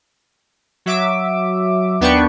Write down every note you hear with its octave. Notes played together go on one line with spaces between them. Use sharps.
F#3 E5 D6
D#2 B3 D4 B4 G5 C#6